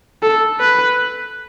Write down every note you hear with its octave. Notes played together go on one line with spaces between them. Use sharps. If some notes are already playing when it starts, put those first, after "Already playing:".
A4
B4